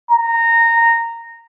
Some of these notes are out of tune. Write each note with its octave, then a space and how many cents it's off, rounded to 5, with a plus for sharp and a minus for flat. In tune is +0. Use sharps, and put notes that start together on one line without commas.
A#5 -15